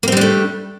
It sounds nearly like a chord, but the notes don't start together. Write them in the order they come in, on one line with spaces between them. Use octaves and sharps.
A#3 C4 G3 D4 A3